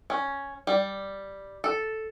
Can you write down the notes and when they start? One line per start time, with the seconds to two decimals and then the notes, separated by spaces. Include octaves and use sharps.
0.10 C#4
0.67 G3
1.64 A4